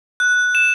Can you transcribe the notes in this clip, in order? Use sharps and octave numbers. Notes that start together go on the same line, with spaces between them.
F#6
E7